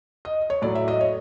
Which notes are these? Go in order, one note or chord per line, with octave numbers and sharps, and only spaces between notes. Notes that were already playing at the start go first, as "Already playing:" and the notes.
D#5
C#5
A2 F#3 A3 D5
E5
D#5
C#5